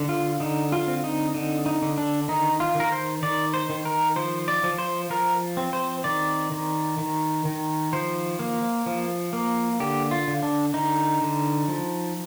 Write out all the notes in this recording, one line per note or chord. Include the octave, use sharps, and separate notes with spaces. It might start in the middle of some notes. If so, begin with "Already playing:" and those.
Already playing: D3
F4
D3 D#4
F4
C4
D#4
D3 D#4
D#4
D3
D4
D#3 D#4
F4
D#3 A#4
C5
D#3 D5
C5
D#3
A#4
F3 C5
D5
F3
C5
F3 A#4
C4
C5
D#3 D5
D#3
D#3
D#3
F3 C5
A#3
F3
A#3
D3 G4
F4
D3
D4
D3 D#4
D3
F3